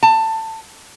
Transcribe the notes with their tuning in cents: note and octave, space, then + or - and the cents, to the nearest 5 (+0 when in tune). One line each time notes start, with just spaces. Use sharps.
A5 +20